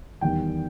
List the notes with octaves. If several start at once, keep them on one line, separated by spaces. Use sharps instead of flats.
E2 D#3 G3 G5